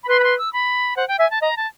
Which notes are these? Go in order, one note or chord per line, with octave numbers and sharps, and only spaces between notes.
B5
B4 C6
B5
C6
E6
B5
C5 F#5
G5
E5 G#5
A5
D#5 A#5
A5